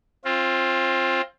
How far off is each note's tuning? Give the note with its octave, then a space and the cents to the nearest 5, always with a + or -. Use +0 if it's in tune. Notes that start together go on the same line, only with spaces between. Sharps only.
C4 +25 F4 +0